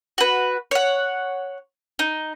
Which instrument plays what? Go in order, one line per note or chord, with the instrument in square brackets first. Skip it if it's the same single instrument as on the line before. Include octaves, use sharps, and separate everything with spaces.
[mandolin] F#4 B4
C#5 F#5
D#4